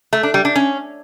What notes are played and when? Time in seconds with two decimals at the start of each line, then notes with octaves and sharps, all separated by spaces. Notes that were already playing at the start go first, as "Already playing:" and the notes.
0.13 A3
0.23 D4
0.34 G3
0.45 D4
0.56 C#4